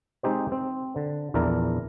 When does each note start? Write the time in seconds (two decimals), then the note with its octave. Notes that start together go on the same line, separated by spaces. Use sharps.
0.23 G#3 C4 D#4 G4 C5
0.52 C4
0.96 D3
1.34 A#1 E2 D4 E4 A#4 A#5